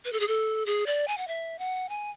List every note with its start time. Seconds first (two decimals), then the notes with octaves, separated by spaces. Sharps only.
0.05 B4
0.13 A4
0.20 G#4
0.28 A4
0.66 G#4
0.86 D5
1.08 G#5
1.18 F#5
1.28 E5
1.59 F#5
1.89 G#5